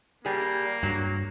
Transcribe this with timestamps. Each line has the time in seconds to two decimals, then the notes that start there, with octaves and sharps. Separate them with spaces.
0.25 G3 A#3 G#4
0.83 G2 F#3